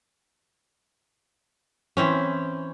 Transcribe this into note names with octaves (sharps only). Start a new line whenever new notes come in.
E3 C4 C#4